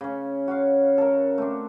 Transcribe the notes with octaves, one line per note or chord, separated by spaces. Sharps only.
C#3 C#4
F#4 C#5 F5
A4 A#4
A3 C4 D4